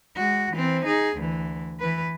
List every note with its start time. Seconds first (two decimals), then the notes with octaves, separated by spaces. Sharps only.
0.16 G#3 F#4
0.52 E3 C4
0.85 D#4 G#4
1.16 D2 E3
1.80 E3 B4